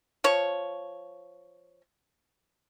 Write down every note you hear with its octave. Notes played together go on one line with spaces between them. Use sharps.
F3 C#5